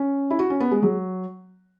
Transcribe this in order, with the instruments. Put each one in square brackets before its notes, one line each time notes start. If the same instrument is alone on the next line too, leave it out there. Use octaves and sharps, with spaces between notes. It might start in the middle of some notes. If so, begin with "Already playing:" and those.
Already playing: [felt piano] C#4
E4
F#4
C#4
B3
G#3
F#3